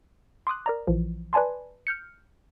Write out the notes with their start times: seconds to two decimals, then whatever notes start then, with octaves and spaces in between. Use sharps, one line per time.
0.47 C6 D6 D#6 F#6
0.66 A#4 D5 A#5
0.87 A#1 E3 F3
1.33 B4 D5 G#5 A5 C6
1.87 F6 G6 C#7